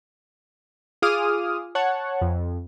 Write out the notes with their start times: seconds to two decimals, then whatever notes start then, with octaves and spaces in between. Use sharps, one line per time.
1.02 F4 G#4 D6 D#6 F6
1.75 C#5 F#5 A5
2.21 F2